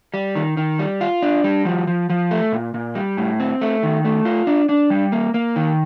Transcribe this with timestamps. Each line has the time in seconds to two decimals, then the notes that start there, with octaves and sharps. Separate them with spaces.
0.14 G3
0.35 D#3
0.57 D#3
0.79 G3
1.01 F4
1.22 D4
1.44 G3
1.65 F3
1.87 F3
2.10 F3
2.31 A3
2.53 A#2
2.74 A#2
2.95 G3
3.17 A2
3.40 C4
3.61 A3
3.83 D#3
4.05 A3
4.25 F4
4.47 D4
4.69 D4
4.90 G3
5.12 A#3
5.34 A#3
5.56 D#3